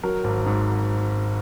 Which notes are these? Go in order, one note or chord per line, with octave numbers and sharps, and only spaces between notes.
F#3 A#4
G#1
G#2